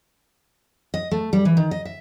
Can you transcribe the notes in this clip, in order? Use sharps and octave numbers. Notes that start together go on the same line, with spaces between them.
D#5
A3
G3
E3
D#3
D#5
E5